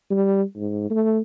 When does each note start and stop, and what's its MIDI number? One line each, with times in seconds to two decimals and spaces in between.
0.10 0.43 55
0.56 0.90 44
0.90 1.20 57